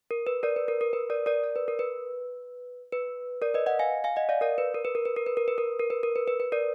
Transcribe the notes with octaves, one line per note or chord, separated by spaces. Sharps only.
A#4
B4
A#4 D5
B4
A#4
A#4
B4
A#4 D5
A#4 D5
D5
B4
A#4
B4
B4
A#4 D5
B4 D#5
D#5 F#5
F5 G#5
F5 G#5
D#5 F#5
D5 F5
A#4 D5
B4
A#4
B4
A#4
B4
A#4
B4
A#4
B4
A#4
A#4
B4
A#4
B4
B4
B4
A#4 D5